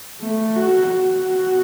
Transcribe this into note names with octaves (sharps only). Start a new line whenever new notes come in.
A3
F#4
F#4